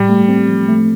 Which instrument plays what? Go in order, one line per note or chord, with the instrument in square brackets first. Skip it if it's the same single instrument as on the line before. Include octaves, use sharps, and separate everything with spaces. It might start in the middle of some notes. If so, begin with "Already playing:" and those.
Already playing: [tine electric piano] A2 [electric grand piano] G3
[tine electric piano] A3
C4
F3
A3